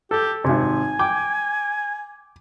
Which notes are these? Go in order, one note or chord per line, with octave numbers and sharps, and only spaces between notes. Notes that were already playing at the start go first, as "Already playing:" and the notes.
G4 A4
G#1 C3 G#5
G5 D6